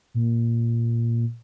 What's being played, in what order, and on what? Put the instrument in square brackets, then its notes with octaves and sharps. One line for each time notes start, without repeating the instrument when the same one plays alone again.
[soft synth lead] A#2